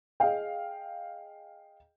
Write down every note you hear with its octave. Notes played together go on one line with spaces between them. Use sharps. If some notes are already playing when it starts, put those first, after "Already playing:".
G#4 D#5 F5 G5